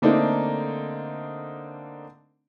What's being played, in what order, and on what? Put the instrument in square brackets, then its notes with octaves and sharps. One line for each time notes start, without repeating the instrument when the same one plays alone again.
[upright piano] D3 A3 A#3 C4 D4 D#4